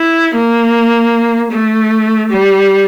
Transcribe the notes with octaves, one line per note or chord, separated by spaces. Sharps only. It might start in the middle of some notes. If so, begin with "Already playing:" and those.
Already playing: E4
A#3
A3
G3